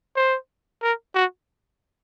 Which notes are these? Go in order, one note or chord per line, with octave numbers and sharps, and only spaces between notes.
C5
A#4
F#4